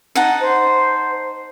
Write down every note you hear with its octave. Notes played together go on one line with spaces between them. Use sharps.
D#4 F#5 A5
C5